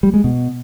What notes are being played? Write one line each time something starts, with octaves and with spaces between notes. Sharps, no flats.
G3
G#3
B2